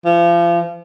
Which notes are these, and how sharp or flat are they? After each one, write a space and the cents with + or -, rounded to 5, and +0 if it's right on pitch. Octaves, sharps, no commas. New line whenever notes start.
F3 -35